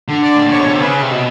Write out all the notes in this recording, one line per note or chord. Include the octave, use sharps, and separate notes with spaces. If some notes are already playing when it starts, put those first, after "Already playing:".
D3
D5
A2
A#2
C#5
B2
C3
C#3 B4
C3
B2